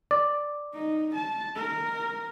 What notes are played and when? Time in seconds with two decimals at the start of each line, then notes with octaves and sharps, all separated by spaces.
0.11 D5
0.74 D#4
1.15 A5
1.55 A#4